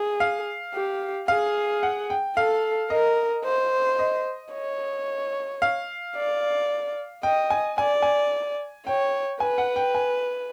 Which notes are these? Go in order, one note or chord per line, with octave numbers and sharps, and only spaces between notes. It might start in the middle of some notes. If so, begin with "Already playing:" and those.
Already playing: G#4
F5
G4
G#4 F5
F#5
G5
A4 F5
A#4 D#5
C5
D#5
C#5
F5
D5
D#5 G5
G#5
D5 G#5
G#5
C#5 G5
B4 G#5
F#5
G5
G#5